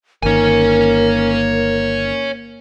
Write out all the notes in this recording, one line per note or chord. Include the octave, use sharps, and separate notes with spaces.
G1 D#3 A#3 A#4 C#5 G#5